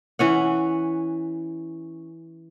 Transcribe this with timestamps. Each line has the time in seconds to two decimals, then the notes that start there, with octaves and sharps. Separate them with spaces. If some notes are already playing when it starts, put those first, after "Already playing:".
0.19 E3 C#4 F#5